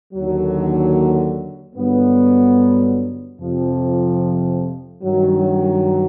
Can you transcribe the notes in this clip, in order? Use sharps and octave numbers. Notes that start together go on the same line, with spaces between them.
D#2 D3 F#3
G2 D3 F#3 B3
F2 C3 F3
G2 D#3 F#3